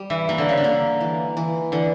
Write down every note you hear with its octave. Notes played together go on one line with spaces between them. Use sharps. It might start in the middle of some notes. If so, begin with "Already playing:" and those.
Already playing: G3
E3
E3 A#3
D3
C#3
D3
A#3
E3
E3
D3 E3